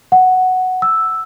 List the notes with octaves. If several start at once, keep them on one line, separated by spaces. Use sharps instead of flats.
F#5
E6